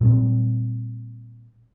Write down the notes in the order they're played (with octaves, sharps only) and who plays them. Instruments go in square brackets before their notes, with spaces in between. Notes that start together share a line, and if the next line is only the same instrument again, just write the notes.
[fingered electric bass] A#2 G3 C4